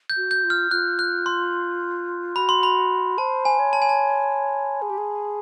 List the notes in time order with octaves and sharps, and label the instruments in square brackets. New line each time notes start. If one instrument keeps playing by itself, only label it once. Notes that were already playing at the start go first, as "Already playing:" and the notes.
[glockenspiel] G6
[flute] F#4
[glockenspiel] G6
[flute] F4
[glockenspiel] F6
[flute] F4 [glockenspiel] F#6
[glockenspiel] F#6
C6
[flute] F#4 [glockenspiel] B5
[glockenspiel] C6
B5
[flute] C5 [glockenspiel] A5
[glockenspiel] G#5
[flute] C#5
[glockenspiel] A5
G#5
A5
[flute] G#4
G4
G#4